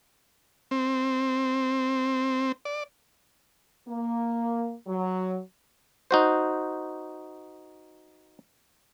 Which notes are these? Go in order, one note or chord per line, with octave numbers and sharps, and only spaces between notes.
C4
D5
A#3
F#3
D#4 F#4 C5